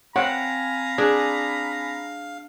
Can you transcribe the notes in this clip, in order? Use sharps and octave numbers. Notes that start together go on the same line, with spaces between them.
C4 C#5 F5 F#5 G#5 A#5 B5
D4 G#4